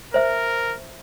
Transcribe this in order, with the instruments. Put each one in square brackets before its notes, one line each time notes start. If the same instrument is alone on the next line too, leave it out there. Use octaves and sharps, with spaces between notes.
[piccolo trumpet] A#4 [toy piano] C5 E5